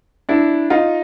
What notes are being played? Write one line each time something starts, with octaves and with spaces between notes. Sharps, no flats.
D4 E4
D#4 F4